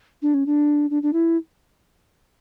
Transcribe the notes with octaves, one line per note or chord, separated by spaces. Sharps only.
D4
C#4
D4
D4
D4
E4